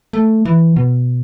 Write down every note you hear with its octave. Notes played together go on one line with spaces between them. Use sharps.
A3
E3
B2